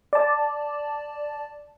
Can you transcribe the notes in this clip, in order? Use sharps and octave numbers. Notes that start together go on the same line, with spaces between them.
D5 A5